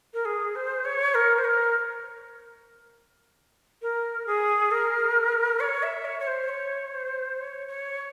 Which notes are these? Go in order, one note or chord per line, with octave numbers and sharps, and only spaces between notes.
A#4
G#4
C5
C#5
A#4
C5
A#4
A#4
G#4
A#4
C#5
E5
C#5
C#5
C5
C#5
C5
C#5
C#5